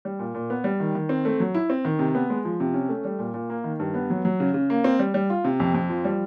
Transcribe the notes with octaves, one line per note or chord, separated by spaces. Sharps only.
G3
A#2
A#2
B3
G3
D#3
D#3
C4
A3
F#3
E4
C4
D#3
C3
B3
G#3
F3
C3
C#4
A3
G3
A#2
A#2
A#3
D#3
G2
B3
F#3
F#3
C#3
C#3
A#3
C4
G3
G3
F4
C3
F2
F2
F3
G3